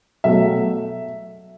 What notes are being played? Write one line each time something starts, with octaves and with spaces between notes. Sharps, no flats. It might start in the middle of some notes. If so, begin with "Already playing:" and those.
B2 F#3 A3 E5